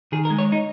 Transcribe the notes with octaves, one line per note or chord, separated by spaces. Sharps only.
D#3 G#4
A#4
G#3
C#5
D#4